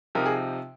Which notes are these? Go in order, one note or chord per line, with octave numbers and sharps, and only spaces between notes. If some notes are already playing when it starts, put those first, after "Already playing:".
C3 F3 C4 D#4 G4 A#4
G#4